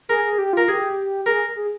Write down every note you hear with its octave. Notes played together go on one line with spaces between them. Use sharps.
G#4 A#4
G#4
G4
F4 A#4
G4 G#4
G#4 A#4
G#4